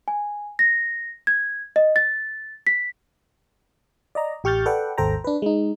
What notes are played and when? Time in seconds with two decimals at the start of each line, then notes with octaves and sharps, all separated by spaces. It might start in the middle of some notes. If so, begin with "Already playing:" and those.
0.08 G#5
0.59 A#6
1.27 G#6
1.76 D#5
1.96 A6
2.67 B6
4.15 D5 D#5 A#5
4.44 A1 G4 C#6 F6 G6 A6
4.66 A4 B4 D5 F#5 G5
4.98 G#1 D#2 A4 C5 G5 A#5
5.24 D4 B4
5.42 G#3 D#4